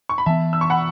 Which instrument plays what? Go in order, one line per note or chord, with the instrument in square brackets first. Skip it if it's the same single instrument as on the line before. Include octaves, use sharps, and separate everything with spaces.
[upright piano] C#6
B5
[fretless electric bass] E3 B3 [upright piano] E5 A5
[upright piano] E6
C#6
F#5 B5